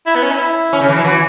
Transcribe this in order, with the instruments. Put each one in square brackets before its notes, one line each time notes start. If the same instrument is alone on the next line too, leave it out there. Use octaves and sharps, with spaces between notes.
[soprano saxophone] E4
B3
C#4
E4
[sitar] C#4
C#3
E3
[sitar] F#3 [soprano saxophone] E4
[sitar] E3 [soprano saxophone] F#4